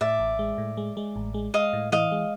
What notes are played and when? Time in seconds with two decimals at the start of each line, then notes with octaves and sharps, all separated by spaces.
0.01 A2 D5 E5
0.20 A1
0.39 G#3
0.58 A2
0.77 G#3
0.97 G#3
1.16 A1
1.34 G#3
1.54 G#3 D#5 F5
1.73 A2
1.92 E3 D#5 F5
2.12 G#3